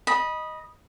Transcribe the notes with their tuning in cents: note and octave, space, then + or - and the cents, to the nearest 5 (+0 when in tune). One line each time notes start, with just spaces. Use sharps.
D#5 +0 B5 -20